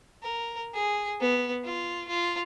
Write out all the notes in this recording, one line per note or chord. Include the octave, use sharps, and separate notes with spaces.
A#4
G#4
B3
F4
F4